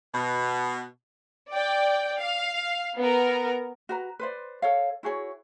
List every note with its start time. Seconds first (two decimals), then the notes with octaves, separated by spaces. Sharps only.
0.14 B2
1.51 D5 G5
2.19 F5
2.97 B3 A#4
3.89 F#4 B4 A#5
4.19 B4 C5 D5
4.62 A4 C#5 F5
5.03 E4 F#4 G#4 C#5